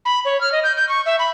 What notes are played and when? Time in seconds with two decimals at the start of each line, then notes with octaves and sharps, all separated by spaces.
0.05 B5
0.25 C#5
0.41 F6
0.52 D#5
0.64 G6
0.76 G6
0.89 C#6
1.06 E5
1.19 B5